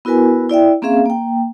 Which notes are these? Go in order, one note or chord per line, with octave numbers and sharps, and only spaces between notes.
B3 E4 F#4 A#4 B4 G#5
E4 D5 E5 G5
A#3 C4 C#4 G#4 E5 F5
A#3 G5